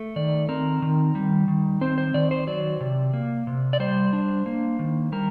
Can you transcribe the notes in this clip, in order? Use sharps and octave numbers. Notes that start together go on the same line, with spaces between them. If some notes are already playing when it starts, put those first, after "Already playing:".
Already playing: A3
D#3 D5
C4 A#4
D#3
G3
D#3
C4 C5
C5
D#3 D5
C5
F#3 D5
C3
A#3
C3
D5
G3 C5
D4
A#3
D#3
G3 A#4